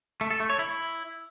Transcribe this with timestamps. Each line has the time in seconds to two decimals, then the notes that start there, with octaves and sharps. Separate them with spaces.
0.21 A3
0.31 A4
0.40 A3
0.50 C#5
0.59 E4